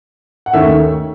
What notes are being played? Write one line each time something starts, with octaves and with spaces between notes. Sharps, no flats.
F#5
D#2 D#3 A3 C#4 E5